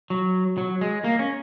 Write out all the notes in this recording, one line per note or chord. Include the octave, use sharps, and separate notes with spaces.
F#3
F#3
G#3
A#3
C#4